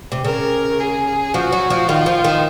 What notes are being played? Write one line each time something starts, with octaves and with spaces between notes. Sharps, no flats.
C3
C#3 A#4
G#4
F3 F#4
F#3
F3
D#3 F4
F3
D#3